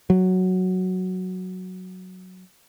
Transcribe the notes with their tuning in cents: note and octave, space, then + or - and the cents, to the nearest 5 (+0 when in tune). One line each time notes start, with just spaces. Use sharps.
F#3 +0